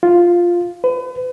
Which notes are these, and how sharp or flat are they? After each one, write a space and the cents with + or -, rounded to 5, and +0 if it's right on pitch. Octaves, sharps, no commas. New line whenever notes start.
F4 +0
B4 +35